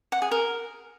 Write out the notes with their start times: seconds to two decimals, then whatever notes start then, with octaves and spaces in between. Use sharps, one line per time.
0.12 F#5
0.22 G#4
0.31 A#4